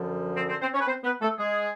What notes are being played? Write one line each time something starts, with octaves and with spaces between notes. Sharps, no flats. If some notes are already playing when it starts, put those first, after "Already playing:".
Already playing: F#2 D3 F3
C4 C5
C4 C5
C4 C5
C#4 C#5
B4
C4 C5
B3 B4
A3 A4
G#3 G#4